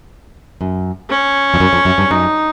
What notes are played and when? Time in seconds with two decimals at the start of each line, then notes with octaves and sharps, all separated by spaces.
0.61 F#2
1.10 C#4
1.54 F2
1.60 F#2
1.73 F2
1.85 F#2
1.98 G2
2.10 F#2 D#4